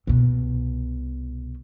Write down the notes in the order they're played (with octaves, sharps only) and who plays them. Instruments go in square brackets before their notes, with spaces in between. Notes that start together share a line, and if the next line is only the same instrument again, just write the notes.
[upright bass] C2 B2